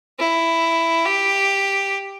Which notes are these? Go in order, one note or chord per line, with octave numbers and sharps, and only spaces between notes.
E4
G4